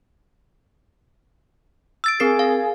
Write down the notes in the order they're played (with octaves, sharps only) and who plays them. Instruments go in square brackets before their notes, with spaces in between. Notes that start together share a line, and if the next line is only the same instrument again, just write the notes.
[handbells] E6 A6 D7
[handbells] C4 A#4 C7 [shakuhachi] G#4
[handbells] F5